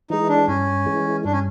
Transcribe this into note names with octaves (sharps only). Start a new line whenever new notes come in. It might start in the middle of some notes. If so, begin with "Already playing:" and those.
E3 G#3 D#4
D4
G2 C#4
E3 G#3
G2 D4
C#4